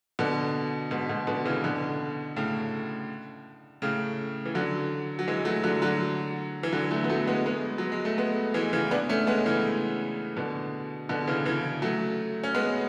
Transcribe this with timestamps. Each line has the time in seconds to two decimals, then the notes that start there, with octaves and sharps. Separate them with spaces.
0.19 B2 D3
0.91 G#2 B2
1.09 G#2 B2
1.27 B2 D3
1.45 C#3 E3
1.64 B2 D3
2.37 A2 C#3
3.82 A2 C#3
4.45 E3
4.55 D3 F#3
5.19 F#3
5.28 E3 G#3
5.45 F#3 A3
5.64 D3 F#3
5.82 D3 F#3
6.63 E3
6.73 D3 F#3
6.91 F#3 A3
7.04 B3
7.10 F#3 A3
7.27 G#3 B3
7.46 G#3 B3
7.78 F#3
7.92 G#3
8.05 A3
8.18 G#3 B3
8.54 E3 G#3
8.73 C#3 E3
8.91 B3 D4
9.09 A3 C#4
9.27 G#3 B3
9.46 C#3 E3
10.37 B2 D3
11.09 B2 D3
11.27 C#3 E3
11.45 C#3 E3
11.82 F#3 A3
12.43 C#4
12.55 G#3 B3